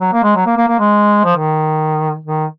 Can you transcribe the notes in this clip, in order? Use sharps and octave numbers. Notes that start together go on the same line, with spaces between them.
F#3
A#3
G#3
F#3
A#3
A#3
A#3
G#3
F3
D#3
D#3